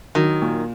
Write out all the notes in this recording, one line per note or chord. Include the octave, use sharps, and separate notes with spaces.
D#3 F#3
A#2